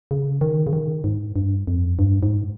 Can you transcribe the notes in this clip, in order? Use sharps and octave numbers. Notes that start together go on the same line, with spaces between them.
C#3
D#3
C#3
D#3
G#2
G2
F2
G2
G#2